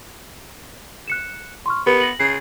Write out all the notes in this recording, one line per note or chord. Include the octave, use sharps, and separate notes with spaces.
F#6 C#7 E7
C6 C#6 F6
B3 G4 A#4 B4
A#6 F#7
C#3 C7